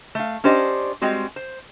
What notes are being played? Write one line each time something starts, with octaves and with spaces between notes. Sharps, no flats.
A3 F5
C#4 D4 G4 C5 D5 D#5
G3 G#3 C4 F#4
C5